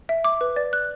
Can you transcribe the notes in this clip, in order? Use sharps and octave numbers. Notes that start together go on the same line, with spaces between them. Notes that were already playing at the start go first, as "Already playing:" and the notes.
E5
D6
B4
D5
F#6